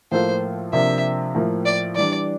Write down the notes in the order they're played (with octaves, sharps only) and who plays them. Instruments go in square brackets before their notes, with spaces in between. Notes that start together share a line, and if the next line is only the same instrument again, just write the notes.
[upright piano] A2 F3 A#3 F4 A4 [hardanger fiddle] C5
[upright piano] C3 F3 A#3 D4 [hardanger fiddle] E5
[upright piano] A2 F3 A#3
[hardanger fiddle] D5
[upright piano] E3 G3 D4 [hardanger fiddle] D5